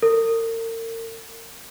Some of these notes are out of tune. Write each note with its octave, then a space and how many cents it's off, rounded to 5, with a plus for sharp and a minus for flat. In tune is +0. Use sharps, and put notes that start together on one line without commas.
A#4 -40